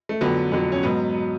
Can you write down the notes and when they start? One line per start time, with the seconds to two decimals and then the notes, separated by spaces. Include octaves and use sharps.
0.09 A3
0.21 F2 D3 F#3 B3
0.52 F2 D3 F#3
0.72 C#4
0.83 G#2 F#3 B3
1.15 F#3